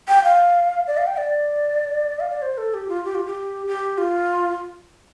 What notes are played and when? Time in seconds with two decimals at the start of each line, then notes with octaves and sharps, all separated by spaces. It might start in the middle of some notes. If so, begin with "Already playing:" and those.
0.08 G5
0.24 F5
0.87 D5
0.97 F5
1.07 G5
1.18 D5
2.20 F5
2.30 D5
2.42 C5
2.58 A4
2.74 G4
2.89 F4
3.05 G4
3.15 F4
3.26 G4
3.67 G4
3.98 F4